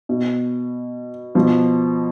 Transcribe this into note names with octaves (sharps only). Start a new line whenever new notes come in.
B2
B2 F3